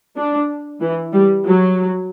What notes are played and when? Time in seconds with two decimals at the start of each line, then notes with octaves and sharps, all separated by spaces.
0.17 D4
0.81 E3
1.13 G3
1.46 F#3